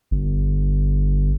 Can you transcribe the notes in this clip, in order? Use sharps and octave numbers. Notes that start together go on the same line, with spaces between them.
G1